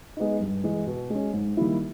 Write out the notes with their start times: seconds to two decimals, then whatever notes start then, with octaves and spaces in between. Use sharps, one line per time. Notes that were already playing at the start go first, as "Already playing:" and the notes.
0.17 G#3 B3 D#4
0.40 G2
0.64 E3 G#3
0.87 B2
1.10 G#3 C#4
1.33 G#2
1.57 D#3 G3 A#3 E4